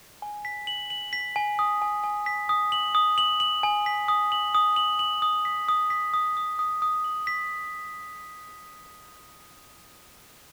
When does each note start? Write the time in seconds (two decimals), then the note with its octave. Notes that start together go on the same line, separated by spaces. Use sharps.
0.22 G#5
0.45 B6
0.67 F#7
0.90 F#7
1.13 B6
1.36 G#5
1.59 D#6
1.82 G#5
2.04 G#5
2.26 B6
2.49 D#6
2.72 F#7
2.95 D#6
3.18 F#7
3.40 F#7
3.63 G#5
3.86 B6
4.08 D#6
4.32 F#7
4.55 D#6
4.76 F#7
4.99 F#7
5.22 D#6
5.45 B6
5.69 D#6
5.90 B6
6.14 D#6
6.37 D#6
6.59 D#6
6.82 D#6
7.04 F#7
7.27 B6